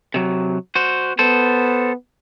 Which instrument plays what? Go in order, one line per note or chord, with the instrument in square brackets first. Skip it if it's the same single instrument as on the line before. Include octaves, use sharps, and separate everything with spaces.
[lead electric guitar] C3 F#3
F#4 C5
[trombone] B3 [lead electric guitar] A4 C5